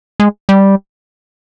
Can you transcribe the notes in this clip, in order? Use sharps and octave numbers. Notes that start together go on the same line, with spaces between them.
G#3
G3